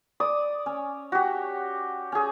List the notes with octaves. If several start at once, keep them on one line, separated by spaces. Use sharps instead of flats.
D5 D#6
C#4
F#4 G4
C#4 G#4